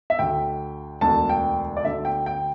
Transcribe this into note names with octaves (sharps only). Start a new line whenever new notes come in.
E5
D2 D3 G5
E1 D2 D3 A5
G5
D5
D2 D3 E5
G5
G5